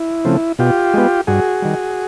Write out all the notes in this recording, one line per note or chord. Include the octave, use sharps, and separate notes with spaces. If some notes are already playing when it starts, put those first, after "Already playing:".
Already playing: E4
C#3 F3 A3 C4
B2 F4 G4
G#3 B3
G2 F#4 G#4
D#3 G3